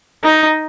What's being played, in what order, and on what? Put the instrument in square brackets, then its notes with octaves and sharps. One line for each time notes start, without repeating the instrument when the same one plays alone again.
[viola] D#4